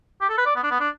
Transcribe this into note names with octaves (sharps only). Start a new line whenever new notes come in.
G4
A4
B4
D5
B3
D4
B3
D4